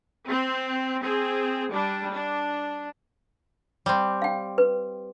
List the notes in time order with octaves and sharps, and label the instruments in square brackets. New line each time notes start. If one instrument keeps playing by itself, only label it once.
[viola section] C4
C4 G#4
G3 D4
D4
[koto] G3 C4
[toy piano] F5 G5
B4